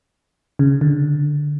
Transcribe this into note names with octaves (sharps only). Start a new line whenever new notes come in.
C#3
D3